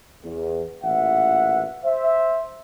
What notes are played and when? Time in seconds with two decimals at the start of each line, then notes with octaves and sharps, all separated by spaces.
0.24 E2
0.83 A1 A#2 E3 E5 F#5
1.84 C5 E5